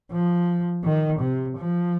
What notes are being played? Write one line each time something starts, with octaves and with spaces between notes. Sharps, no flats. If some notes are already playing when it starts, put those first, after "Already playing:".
F3
D#3
C3
F3